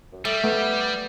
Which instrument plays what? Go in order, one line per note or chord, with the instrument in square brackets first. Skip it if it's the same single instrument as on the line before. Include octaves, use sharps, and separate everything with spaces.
[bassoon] F#2
[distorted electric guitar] G3 [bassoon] A3 [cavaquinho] E5
[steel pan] A3 [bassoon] B3